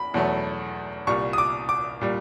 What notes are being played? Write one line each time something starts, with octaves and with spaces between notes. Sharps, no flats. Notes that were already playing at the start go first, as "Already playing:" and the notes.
Already playing: E2 B5
E2 B2 F#3 A3
C2 A#2 G3 C#6
D#6
D6
D6
A#2 G3